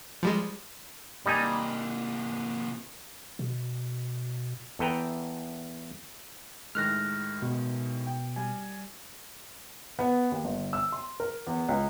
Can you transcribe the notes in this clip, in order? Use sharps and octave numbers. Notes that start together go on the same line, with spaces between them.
F3 G3 G#3
C3 G3 A#3 D#4 G#5
B2
E2 A4 B4 G5 A#5
A2 D#3 G#3 F6 F#6 A#6
B2
G5
G3 G#5
B3
D#2
G1
E6
C6
A#4
E2
C#2